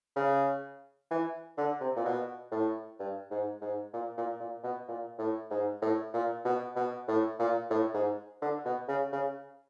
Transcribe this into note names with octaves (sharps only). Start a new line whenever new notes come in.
C#3
E3
D3
C3
A#2
B2
A2
G2
G#2
G#2
A#2
A#2
A#2
B2
A#2
A2
G#2
A2
A#2
B2
B2
A2
A#2
A2
G#2
D3
B2
C#3
C#3